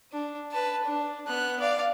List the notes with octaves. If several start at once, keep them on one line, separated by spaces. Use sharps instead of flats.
D4
B4 A5
D4
B3 F#6
D5 F5